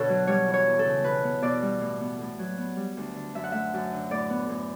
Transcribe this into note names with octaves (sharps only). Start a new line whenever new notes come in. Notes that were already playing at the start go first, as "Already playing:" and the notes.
Already playing: B2 D3 B3 A4 C#5
F#3
G3 C#5
E3
C#5
E2
A4
C#3
B2 B4
B3
B2 D5
G3
A2
B3
A2
F#3
B3
G3
D2
D3
F#2 E5
F#5
A3 E5
F#2
D3
A2 D5
B3
A2